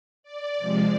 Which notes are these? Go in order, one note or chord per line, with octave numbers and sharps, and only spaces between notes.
D5
C3 F3 G#3